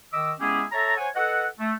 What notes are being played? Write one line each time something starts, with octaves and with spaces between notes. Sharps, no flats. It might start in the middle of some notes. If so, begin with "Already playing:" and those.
D#3 D#5 D6 E6
G#3 B3 C#4 E4 G4 G#4
A4 C#5 E5 A5 A#5
C5 C#5 F#5 G#5
A4 B4 D#5 F#5
A3